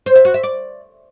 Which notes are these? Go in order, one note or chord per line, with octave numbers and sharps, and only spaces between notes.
C5
E5
F#4
E5
D5